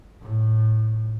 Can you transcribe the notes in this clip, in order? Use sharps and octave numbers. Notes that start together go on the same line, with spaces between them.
A2